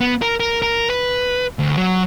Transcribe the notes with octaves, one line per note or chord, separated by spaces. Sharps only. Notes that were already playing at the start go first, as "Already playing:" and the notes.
B3
A#4
A#4
A#4
B4
D2
F#3